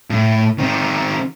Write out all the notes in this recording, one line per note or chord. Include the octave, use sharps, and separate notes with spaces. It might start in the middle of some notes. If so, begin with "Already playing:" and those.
A2
D#3 C4